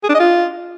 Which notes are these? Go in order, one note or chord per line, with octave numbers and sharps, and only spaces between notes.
G#4
D4
D#5
F4